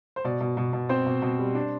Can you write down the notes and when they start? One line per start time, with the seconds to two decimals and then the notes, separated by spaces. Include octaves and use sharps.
0.16 C5
0.25 B2 D5
0.41 B2
0.57 B2
0.73 B2
0.89 C4 C5
1.06 B2
1.22 B2
1.39 G3
1.55 D4